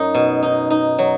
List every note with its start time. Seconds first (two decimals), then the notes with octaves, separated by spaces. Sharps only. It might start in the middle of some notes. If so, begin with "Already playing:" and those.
Already playing: F#2 D#4
0.14 B2
0.43 D#4
0.70 D#4
0.99 F#3